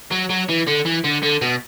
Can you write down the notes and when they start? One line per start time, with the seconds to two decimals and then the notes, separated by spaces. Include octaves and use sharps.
0.12 F#3
0.30 F#3
0.49 E3
0.68 D3
0.86 E3
1.05 D3
1.23 D3
1.42 B2